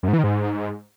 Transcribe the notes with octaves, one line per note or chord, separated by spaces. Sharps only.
F#2
G#2
E3
D#3
G#2